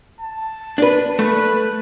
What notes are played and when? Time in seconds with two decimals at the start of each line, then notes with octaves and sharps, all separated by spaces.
0.21 A5
0.78 D4 B4
1.19 A3 B4